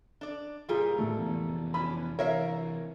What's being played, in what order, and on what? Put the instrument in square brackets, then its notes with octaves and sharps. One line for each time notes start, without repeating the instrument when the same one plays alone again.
[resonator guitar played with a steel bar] D4 D5
[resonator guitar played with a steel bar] A#2 G3 A#4 [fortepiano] F4 G#4
[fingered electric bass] A2 D3 D#3 [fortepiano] A3
[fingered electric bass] F1 E3 B3
[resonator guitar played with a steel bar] C#4 D4 [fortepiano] B5
[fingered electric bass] C3 E3 [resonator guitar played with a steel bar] A#4 E5 F5 [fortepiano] C#5